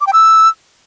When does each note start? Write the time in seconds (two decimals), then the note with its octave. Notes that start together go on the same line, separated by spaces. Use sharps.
0.01 D6
0.07 G5
0.13 E6